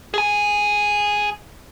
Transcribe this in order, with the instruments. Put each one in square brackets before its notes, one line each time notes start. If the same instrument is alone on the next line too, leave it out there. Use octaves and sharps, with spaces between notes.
[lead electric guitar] G#4 G#5